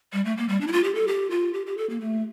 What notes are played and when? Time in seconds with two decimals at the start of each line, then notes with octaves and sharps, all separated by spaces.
0.13 G3
0.25 A3
0.37 A#3
0.49 G3
0.61 D4
0.67 E4
0.73 F4
0.84 G4
0.95 A4
1.08 G4
1.31 F4
1.54 G4
1.67 G4
1.78 A4
1.90 A#3
2.01 A3